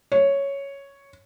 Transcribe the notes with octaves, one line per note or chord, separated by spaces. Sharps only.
C#5